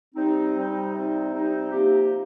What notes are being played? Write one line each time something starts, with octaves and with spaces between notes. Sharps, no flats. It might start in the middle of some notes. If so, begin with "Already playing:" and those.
C3 G3 C4 D#4
C3 G3 C4 D#4
C3 G3 C4 D#4
C3 G3 C4 D#4
C3 F3 A#3 D#4 G4